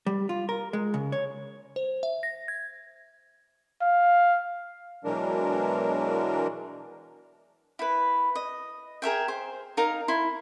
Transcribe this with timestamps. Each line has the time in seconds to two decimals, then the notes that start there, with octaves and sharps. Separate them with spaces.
0.06 G3
0.29 F4
0.49 A#4
0.73 G#3
0.94 C#3
1.12 C#5
1.76 C5
2.03 E5
2.23 A#6
2.48 G#6
3.82 F5
5.05 B2 E3 F#3 G#3 D4 A#4
7.79 E4 B4
8.35 D#5
9.02 G#4 A#4 E5 G5
9.28 C5
9.77 D#4 A#4 F5 A#5
10.08 E4 C6